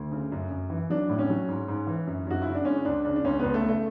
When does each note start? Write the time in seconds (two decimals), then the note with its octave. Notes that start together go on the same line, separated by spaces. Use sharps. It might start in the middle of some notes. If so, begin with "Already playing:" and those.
Already playing: D2
0.12 C#3
0.32 F#2
0.51 F#2
0.70 E3
0.90 F#3 D4
1.09 A2
1.19 C#4
1.30 F#3
1.49 G#2
1.68 G#2
1.87 E3
2.07 F#2
2.27 F#2 F#4
2.42 C#3 E4
2.55 D4
2.65 G#3 C#4
2.85 C#2 D4
3.05 C#3 D4
3.16 D4
3.24 C#2 C#4
3.39 C#2 B3
3.54 A3
3.63 C#3
3.69 A3